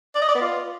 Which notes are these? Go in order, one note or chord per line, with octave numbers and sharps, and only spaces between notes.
D5
D#5
D5
B3
F4